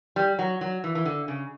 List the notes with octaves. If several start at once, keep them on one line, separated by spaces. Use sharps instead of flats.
G3
F#3
F#3
E3
E3
D3
C#3